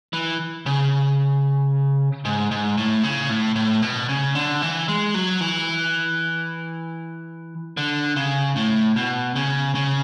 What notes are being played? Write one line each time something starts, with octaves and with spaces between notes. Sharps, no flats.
E3
C#3
G#2
G#2
A2
C#3
A2
A2
B2
C#3
D3
E3
G#3
F#3
E3
D3
C#3
A2
B2
C#3
C#3